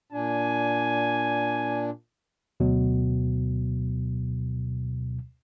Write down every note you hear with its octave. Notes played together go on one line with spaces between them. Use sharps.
A#2 D4 G#5
D2 B2 F#3